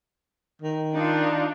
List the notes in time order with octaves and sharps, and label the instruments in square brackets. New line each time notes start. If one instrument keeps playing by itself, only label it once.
[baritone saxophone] D#3
[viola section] D4 [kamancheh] D#4 F4